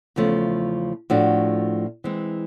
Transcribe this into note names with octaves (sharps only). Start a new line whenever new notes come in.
E2 C#3 F3 A3
A2 F3 A3 D4 F#4
E3 G#3 C4